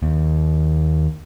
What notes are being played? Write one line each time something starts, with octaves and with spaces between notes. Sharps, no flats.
D#2